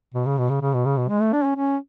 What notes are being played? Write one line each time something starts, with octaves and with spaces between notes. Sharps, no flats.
B2
C#3
B2
C#3
C#3
B2
C#3
B2
G#3
A3
D4
C#4
C#4